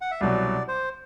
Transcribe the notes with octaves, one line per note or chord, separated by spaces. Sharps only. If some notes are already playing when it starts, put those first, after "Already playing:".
F#5
E5
C2 B2 F#3 D5
C5